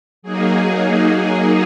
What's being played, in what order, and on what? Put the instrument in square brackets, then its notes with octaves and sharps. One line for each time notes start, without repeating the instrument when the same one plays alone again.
[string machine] F#3 A#3 D#4 G#4